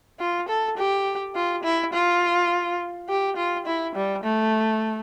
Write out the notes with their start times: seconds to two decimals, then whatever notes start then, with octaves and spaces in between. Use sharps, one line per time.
0.20 F4
0.49 A4
0.77 G4
1.35 F4
1.64 E4
1.93 F4
3.09 G4
3.37 F4
3.66 E4
3.95 G3
4.24 A3